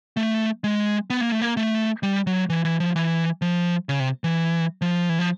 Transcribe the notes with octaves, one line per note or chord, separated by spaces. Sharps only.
A3
G#3
B3
A#3
A3
A#3
A3
G3
F#3
E3
E3
F3
E3
F3
C#3
C3
E3
F3
E3
F3